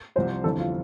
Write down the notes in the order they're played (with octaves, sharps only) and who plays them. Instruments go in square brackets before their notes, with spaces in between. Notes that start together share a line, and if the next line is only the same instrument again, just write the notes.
[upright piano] C2 C3 F3 C4 [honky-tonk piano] C5
[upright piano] G1 F2 E3 [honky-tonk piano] A4
[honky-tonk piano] F4